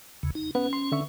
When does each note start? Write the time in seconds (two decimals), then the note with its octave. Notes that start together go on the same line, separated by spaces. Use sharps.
0.23 E2 C#3
0.35 D#4
0.55 B3 C#4 B4 F#5
0.73 C6
0.92 D3 E5 C#6